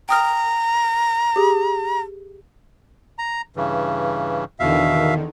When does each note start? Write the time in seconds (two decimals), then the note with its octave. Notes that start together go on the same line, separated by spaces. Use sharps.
0.09 G5 A#5 D#6 F6
1.36 G4 G#4
3.18 A#5
3.56 G2 C#3 E3
4.60 E2 B2 D3 D#3 E5 F5